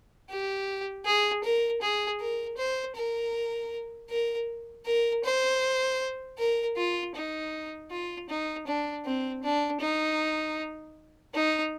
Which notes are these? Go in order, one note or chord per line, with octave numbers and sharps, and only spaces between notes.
G4
G#4
A#4
G#4
A#4
C5
A#4
A#4
A#4
C5
A#4
F4
D#4
F4
D#4
D4
C4
D4
D#4
D#4